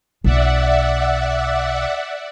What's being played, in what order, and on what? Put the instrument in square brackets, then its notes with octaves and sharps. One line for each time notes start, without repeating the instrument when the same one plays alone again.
[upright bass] B1 F4 [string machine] D5 E5 F#5